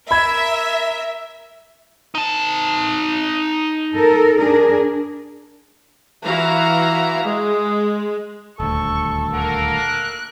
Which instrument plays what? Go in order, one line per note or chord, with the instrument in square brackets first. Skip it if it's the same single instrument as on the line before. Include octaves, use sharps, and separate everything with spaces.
[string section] A#4 E5 [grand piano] B5 G#6
[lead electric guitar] D#4 A5
[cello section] A4 A#4
D4 G#4 A#4
[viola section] E3 E4 F#4 F5 A#5
G#3
[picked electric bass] D#1 D2 [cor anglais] A4 [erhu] C#6
[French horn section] A#3 A#4 [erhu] F#5
[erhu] F#6